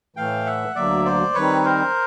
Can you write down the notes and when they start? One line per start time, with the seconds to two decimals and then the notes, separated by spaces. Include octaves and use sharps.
0.16 A2 E3 A3 F5 G5
0.46 E5 F#5
0.75 D2 D3 F#3 A#3 D5 E5
1.05 C5 D5
1.35 D#3 G3 C4 D#4 B4 C#5
1.65 A#4 C5